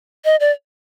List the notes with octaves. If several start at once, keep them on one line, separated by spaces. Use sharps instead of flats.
D#5
D5